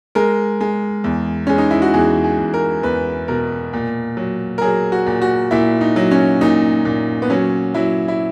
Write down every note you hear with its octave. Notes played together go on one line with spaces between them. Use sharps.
G#3 A#4
G#3
E2
G#3 C#4
D#4
E4
F#4
E2 G#4
G#4
E2
A#4
E2 B4
B2 A#4
A#2
F#3
A#4
F#3 G#4
F#4
A#2
F#4
A#2 E4
D#4
F#3
C#4
A#2 D#4
A#2
B3
F#3 C#4
F#3 E4
E4